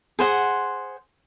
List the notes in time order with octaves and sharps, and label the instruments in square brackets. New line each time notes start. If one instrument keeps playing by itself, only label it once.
[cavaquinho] G#4 C5 F#5